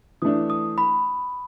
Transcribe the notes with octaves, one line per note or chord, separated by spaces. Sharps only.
E3 A3 D4 D#6
D#6
B5